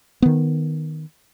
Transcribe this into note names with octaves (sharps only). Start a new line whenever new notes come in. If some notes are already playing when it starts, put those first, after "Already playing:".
D#3 B3